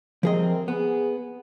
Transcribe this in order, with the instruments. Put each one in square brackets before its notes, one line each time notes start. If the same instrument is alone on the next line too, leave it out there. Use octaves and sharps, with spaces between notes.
[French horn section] C3 C4 A#4 [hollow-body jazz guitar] F3 G#4 D#5
[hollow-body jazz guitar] B3 [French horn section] G#4